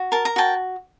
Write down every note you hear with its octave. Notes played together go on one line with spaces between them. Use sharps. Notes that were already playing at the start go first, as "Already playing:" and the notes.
Already playing: F#4
A#4 A5
A#5
F#4 G5 A5